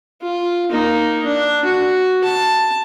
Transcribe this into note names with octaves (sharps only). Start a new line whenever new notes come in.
F4
A#3 D#4
D4
F#4
A5